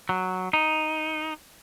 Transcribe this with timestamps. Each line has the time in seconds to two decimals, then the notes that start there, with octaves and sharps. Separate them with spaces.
0.09 F#3
0.53 D#4